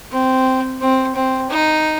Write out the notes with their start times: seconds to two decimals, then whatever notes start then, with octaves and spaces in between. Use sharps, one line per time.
0.12 C4
0.81 C4
1.15 C4
1.50 D#4